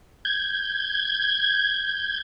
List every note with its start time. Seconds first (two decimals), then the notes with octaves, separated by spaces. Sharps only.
0.25 G6 G#6